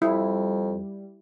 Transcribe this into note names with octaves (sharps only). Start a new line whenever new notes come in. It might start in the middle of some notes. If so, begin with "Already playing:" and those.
F2 G3 E4